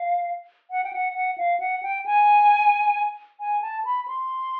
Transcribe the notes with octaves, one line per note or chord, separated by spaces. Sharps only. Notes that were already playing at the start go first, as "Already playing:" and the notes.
Already playing: F5
F#5
G5
F#5
F#5
F5
F#5
G5
G#5
G#5
A5
B5
C6